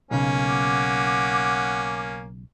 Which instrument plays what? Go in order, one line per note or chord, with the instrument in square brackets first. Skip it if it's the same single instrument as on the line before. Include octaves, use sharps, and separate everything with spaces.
[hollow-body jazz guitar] B1 C#3 [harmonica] A#3 C#4
[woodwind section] F#5 D6